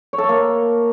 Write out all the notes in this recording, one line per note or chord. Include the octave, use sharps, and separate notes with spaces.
C#5
A4
C#5
A#3